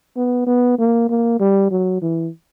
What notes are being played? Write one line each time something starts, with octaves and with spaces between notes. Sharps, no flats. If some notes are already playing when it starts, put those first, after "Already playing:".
B3
B3
A#3
A#3
G3
F#3
E3